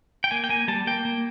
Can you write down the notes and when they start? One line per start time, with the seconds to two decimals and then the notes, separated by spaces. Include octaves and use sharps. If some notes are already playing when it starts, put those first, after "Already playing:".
0.24 G5
0.31 A#3 G#5
0.44 G5
0.49 A#3 G#5
0.68 G3 A5
0.87 A#3 G5
1.05 A#3